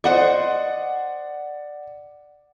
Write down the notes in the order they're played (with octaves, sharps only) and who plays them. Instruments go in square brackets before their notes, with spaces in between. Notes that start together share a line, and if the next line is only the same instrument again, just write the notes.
[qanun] C5 D#5 C#6 [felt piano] D5 F#5